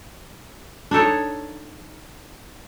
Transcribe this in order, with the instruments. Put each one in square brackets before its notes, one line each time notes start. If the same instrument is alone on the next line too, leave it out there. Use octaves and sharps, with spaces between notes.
[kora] D4 D#4 A4 C#5